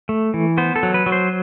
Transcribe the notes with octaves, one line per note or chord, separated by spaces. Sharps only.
A3
E3
B3 C5
A4
F#3
B4
F#3
C5